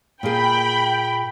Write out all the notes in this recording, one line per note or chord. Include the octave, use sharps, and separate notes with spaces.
A#2 A#3 G#4 G5 B5